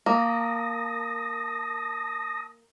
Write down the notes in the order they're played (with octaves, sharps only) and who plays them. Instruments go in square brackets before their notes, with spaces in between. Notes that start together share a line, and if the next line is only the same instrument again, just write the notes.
[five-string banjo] A#3 [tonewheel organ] A5 D#6 A#6